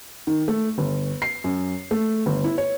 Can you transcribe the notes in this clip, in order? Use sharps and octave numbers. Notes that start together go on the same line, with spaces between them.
D#3
A3
G1
C7
F#2
A3
G1
E4
C#5